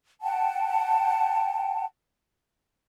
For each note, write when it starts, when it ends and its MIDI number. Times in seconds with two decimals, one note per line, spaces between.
0.21 1.85 78
0.21 1.85 79
0.21 1.85 81